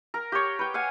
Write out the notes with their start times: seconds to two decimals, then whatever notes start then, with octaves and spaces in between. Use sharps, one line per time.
0.14 A#4
0.32 G4 C#5
0.59 B4 G5
0.74 F5 F#5 G#5